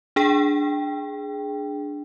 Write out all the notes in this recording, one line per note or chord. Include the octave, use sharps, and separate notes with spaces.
D4 G#4 G5